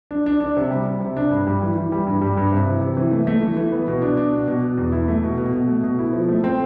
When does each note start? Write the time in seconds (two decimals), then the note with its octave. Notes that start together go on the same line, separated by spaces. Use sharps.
0.11 D4
0.26 D4
0.41 D4
0.56 C3
0.71 G3
0.86 G3
1.00 C3
1.17 D4
1.31 G2
1.47 G3
1.62 E3
1.76 E3
1.92 G3
2.07 G2
2.22 G3
2.37 G2
2.52 C3
2.67 E3
2.81 C3
2.97 E3
3.11 A3
3.27 A3
3.42 E3
3.57 E3
3.72 B3
3.88 B2
4.02 D4
4.17 D4
4.32 B2
4.47 B2
4.62 B2
4.77 E2
4.92 E4
5.08 A3
5.23 B2
5.38 B2
5.53 B2
5.68 A3
5.84 B2
5.99 E4
6.13 F3
6.29 A3
6.44 C4